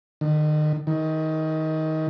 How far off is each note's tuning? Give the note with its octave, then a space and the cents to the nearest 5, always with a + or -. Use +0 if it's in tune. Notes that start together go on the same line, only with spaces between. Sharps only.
D#3 -35
D#3 +20